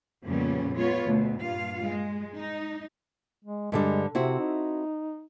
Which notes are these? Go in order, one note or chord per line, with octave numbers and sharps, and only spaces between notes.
F2 A#2 C#3 G3 B3 C#4
G#3 B3 F4 C#5
D2 B2
G2 A#2 F4 F5
G#3
D#4
G#3
G2 D3 G3 G#3
C3 C4 E4 F#4
D#4